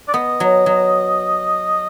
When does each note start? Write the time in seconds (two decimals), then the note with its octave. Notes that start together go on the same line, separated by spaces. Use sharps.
0.08 D5
0.14 B3 D#5
0.40 F#3
0.66 F#3